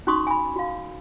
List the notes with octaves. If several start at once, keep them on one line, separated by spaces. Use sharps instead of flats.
C#4 D#4 F#4 C6 C#6 D#6
G#5 B5
F#4 F5